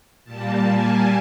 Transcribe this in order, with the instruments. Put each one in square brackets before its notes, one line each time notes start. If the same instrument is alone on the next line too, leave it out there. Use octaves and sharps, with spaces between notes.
[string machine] A#2 G3 A#3 A5
G#5